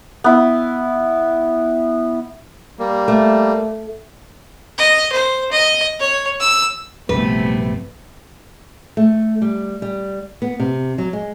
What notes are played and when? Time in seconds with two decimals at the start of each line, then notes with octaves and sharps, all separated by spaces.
0.24 B3 E4
2.79 G3 A#3
3.08 A3
4.78 D#5
5.12 C5
5.51 D#5
6.00 C#5
6.40 E6
7.09 A#1 G2 C3 F#3 A3 B3 B4
8.97 A3
9.42 G3
9.82 G3
10.42 B3
10.60 C3
10.98 F#3
11.13 G#3